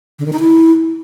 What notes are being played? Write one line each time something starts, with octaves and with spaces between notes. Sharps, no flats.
D3
D#3
D#4
E4